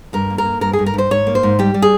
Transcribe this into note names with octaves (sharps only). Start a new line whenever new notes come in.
G2 A#4
A#3
A#4
A#3
G2 A#4
G#4
G2
A#4
G2 C5
G#2 C#5
A#3
C5
G#2
G3 G4
G3
G#4